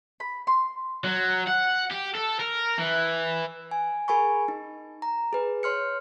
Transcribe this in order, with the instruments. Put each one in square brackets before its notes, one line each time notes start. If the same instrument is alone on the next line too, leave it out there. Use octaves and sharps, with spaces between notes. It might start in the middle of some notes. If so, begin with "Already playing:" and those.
[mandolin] B5
C6
[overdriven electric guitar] F#3
F#5
G4
A4
A#4
E3
[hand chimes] G#5
G#4 A#4 G#5 B5 C#6
D#4
A#5
G#4 B4
C#5 C6 F6 C#7